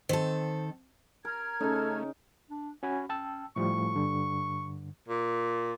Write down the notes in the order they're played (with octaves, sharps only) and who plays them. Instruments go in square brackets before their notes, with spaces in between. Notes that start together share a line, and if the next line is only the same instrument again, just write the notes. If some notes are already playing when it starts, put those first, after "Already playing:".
[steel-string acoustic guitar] D#3 A4 [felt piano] C4
[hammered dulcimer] A#4 [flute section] A#5 F6 G#6
[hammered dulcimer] C#3 D#4 [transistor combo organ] A3 C#4 [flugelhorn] A4
[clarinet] D4
[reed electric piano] C#4 F#4 B5 [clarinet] G#5
[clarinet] C#4 [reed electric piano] G5 A5 E6
[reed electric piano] A2 F3 G3 [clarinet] C#6
[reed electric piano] G2 D3
[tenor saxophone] A#2